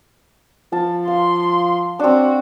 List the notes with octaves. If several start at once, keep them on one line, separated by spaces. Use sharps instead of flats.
F3 A5
F5 C6
C4 D4 F#4